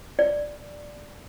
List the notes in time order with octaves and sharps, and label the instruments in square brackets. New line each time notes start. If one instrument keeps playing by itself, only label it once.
[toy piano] D5